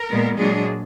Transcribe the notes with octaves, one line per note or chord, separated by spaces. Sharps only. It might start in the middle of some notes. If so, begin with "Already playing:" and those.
Already playing: A#4
A#2 G#3 B3
A#2 F#3 G#3 D4 G#4